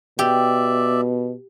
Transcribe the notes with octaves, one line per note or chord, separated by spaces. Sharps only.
B2 G4 D5 E5